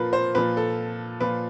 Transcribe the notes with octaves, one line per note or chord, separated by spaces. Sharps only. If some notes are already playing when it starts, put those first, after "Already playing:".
Already playing: A#2 F3 A#4 B4
C5
A#2 F3 B4
A4
A#2 F3 B4